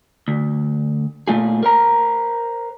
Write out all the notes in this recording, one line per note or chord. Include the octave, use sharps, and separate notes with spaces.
D2
A#2 A3 F4 G#4
A#4 C5 A#5